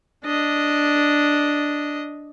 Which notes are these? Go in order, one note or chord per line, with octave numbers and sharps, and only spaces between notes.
D4 D#5